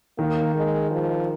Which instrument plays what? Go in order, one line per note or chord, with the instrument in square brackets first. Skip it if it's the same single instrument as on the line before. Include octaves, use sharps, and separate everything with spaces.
[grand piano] D#3 [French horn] A#3
[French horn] G#3
F3